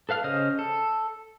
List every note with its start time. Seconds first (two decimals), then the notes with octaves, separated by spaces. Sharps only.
0.09 A4 B4 F5 F6
0.24 C#3 C5 D#5 F6
0.59 A4